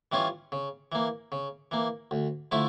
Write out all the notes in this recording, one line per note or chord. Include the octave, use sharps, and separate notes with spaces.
E3 G3 C#4 F4
C#3
E3 A#3
C#3
E3 A#3
D2
D3 F3 A3 E4